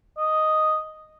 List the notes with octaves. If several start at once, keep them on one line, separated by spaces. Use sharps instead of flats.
D#5